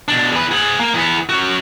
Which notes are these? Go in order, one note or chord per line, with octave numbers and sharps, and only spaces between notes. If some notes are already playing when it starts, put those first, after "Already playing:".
B2 D4
E2 B4
G#4 F#5
A#3
E2 B3
C#4 F#4